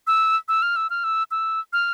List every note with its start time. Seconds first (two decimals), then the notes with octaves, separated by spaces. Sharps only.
0.07 E6
0.48 E6
0.62 F6
0.76 E6
0.90 F6
1.04 E6
1.31 E6
1.73 F6